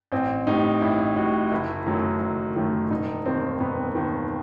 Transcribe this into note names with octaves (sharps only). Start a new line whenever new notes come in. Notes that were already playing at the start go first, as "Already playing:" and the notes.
A1 C4
A2 G3 D#4
A1 E4
A2 G3 F#4
F#1 E4
F#2 D#3 F#3 A3
F#1
F#2 D#3 F#3 A3
E1 D#4
D#2 D#3 C4
E1 B3
D#2 D#3